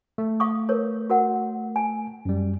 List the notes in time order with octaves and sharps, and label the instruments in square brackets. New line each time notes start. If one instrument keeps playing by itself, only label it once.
[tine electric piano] A3
[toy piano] F5 C#6 D#6
A#4 B4 C#5
F#4 A#4 F#5
G#5
[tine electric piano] F#2 G3